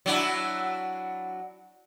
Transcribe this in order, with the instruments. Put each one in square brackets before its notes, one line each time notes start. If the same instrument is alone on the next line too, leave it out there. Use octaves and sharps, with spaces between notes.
[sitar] F#3 D4 E4